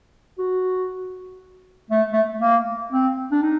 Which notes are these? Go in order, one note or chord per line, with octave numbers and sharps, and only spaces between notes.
F#4
A3
A3
A#3
C4
D4
D#4